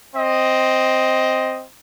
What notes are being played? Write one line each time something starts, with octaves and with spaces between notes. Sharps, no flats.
C4 D#5